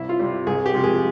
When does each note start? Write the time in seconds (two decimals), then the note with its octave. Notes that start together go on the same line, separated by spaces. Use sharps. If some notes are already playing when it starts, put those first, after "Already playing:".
Already playing: C2 E4
0.09 F4
0.19 C3 G3
0.47 C2 G#4
0.66 G4
0.74 C3 F3 G#3
0.84 G#4